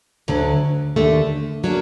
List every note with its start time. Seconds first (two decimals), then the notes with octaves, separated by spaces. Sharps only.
0.28 D2 D3 F#3
0.96 D#2 D3 A3
1.64 F#3 A#3 D4